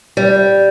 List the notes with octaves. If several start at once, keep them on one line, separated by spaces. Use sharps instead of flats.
G3